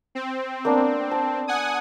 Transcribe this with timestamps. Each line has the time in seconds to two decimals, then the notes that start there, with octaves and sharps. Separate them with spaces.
0.15 C4
0.65 A#3 B3 D4
1.11 A5
1.47 F#5 G#5 D#6